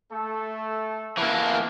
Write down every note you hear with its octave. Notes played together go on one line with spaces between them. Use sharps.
A3 A4
E3 A#3 E5 F#5 A5